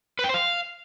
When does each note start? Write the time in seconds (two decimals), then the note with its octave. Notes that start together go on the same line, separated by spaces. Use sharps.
0.19 B4
0.24 G5
0.29 C5
0.34 F5